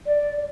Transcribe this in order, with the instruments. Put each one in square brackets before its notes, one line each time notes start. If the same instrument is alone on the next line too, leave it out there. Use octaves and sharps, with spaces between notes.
[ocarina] D5